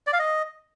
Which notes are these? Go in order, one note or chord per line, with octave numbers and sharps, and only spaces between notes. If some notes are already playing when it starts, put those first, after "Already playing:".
D5
F5
D#5